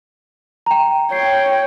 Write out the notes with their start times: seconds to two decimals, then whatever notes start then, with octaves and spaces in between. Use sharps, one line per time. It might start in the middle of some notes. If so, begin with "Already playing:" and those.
0.66 G5 A#5
1.12 C#5 G5 C7